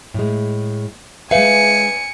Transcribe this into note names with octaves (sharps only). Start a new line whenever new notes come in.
A2 G#3
G#3 B4 E5 F5 G#5 C#7